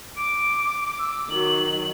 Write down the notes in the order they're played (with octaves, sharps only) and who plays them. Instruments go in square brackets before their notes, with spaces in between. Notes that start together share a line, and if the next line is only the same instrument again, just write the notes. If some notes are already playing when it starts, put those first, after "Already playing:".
[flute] D6 [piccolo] D7
[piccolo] E6
[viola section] D#3 F#3 [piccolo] F#7